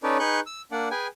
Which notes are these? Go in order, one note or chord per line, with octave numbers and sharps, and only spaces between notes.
C#4 D#4 A4 B4 C#5 D5
D#4 G#4 B4 C#6 F#6 G6
E6
A#3 D4 D5 F#5
G#4 B4 G5 G#5